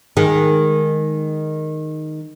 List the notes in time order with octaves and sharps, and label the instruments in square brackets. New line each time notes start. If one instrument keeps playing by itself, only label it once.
[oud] D#3 G#3